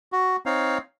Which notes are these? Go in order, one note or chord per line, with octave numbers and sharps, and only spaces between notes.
F#4
C4 D#4 C#5 F5